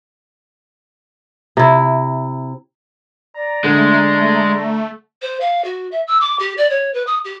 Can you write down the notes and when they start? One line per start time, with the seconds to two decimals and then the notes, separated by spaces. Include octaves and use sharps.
1.57 C3 E4
3.35 D5 A#5
3.64 D3 G#3 A3
5.22 C5
5.40 F5
5.64 F#4
5.91 E5
6.07 E6
6.20 D6
6.39 G4
6.57 D5
6.70 C#5
6.94 B4
7.06 D#6
7.24 G4